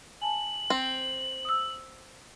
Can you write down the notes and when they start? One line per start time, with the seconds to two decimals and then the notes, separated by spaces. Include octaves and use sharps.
0.22 G#5 A5 F#7
0.70 C4
1.45 D#6 E6